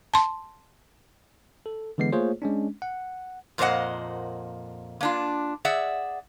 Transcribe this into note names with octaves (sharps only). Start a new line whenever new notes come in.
A5 C6
A4
D3 E3 G#3 B3 C7
A3 A#3 F4 G#4 C5 C#5
G#3 C#4 D4
F#5
F2 A#2 A#3 C5 D#5 F#5
A#3 D4 F4
G#4 D5 E5 F#5